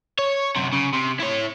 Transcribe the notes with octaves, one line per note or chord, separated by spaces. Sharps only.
C#5
F#2 C3
C#3
C3
E4 C#5